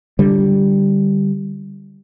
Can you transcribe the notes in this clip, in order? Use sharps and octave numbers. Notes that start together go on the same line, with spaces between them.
D3 G3